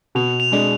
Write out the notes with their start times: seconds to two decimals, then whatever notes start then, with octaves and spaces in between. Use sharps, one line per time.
0.15 B2 F7
0.40 F7
0.52 G#3 D4